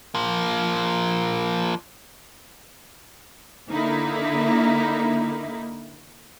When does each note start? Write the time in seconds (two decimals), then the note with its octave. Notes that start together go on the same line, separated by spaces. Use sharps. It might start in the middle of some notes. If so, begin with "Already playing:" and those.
0.15 F3 A#3
3.70 D3 A#3 D#4 E4